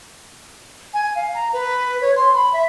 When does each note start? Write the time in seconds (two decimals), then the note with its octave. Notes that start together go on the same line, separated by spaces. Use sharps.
0.94 G#5
1.15 F5
1.34 A#5
1.53 B4
2.02 C#5
2.16 C6
2.34 B5
2.53 E5